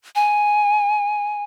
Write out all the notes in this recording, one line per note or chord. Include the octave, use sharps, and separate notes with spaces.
G#5